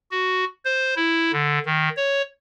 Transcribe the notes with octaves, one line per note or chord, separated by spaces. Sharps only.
F#4
C5
E4
D3
D#3
C#5